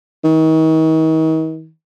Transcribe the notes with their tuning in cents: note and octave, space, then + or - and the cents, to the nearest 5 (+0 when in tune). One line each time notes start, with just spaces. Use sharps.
D#3 +40